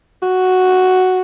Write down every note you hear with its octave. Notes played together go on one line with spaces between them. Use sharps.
F#4